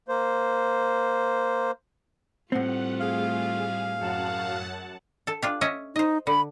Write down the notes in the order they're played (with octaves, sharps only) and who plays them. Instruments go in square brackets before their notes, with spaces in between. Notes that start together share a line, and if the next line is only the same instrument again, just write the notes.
[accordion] A#3 C5
[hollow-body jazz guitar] A2 C4 [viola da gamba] G3 A3 F4 [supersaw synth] F#5
[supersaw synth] G#4 [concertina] F5
[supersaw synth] F#2 F#5 A5 [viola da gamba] F#3
[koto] A4 A5
D4 F4 G4
C#4 D#5 E5
[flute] D#4 [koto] C5 D#5
[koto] D3 [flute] B5